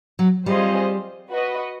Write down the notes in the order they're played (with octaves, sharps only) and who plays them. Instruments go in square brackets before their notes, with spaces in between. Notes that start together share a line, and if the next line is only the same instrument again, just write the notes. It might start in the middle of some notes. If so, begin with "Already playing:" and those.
[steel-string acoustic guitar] F#3
[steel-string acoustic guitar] G3 [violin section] C4 F4 G#4 C5 D#5
[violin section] F#4 B4 D#5